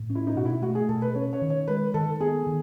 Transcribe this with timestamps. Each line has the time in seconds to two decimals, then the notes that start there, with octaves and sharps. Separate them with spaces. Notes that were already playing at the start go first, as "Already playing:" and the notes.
Already playing: A2
0.10 C#4
0.15 E4
0.27 D#4
0.36 B2 F#4
0.45 E4
0.62 A3 F#4
0.75 G#4
0.89 B2 A4
1.02 B4
1.15 C#4 C#5
1.33 C#5
1.41 D#3
1.50 C#5
1.68 G#3 B4
1.94 D#3 A4
2.20 B3 G#4
2.46 D#3